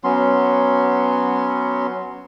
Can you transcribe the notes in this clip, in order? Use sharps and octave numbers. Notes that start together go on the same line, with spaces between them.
F#3 B3 C#4 C6